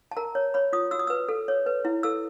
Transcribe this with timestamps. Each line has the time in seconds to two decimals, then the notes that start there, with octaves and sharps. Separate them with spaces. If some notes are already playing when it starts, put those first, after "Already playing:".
0.11 A5
0.17 A#4 A#5
0.35 C#5
0.54 C#5 B5
0.73 F4 D#6
0.91 F#4 E6
0.99 D#6
1.07 B4 E6
1.29 A4
1.48 C#5
1.66 B4
1.85 E4
2.03 A4 E6